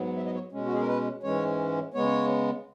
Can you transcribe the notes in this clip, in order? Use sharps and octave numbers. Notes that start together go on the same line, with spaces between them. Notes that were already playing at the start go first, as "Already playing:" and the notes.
Already playing: G#2 F#3 B3
E5
D#5
C#5
B2 G#3 C#4
F#4
G#4
A#4
B4
G#2 E3 G#3 C#4 C#5
C#3 G#3 B3 C#5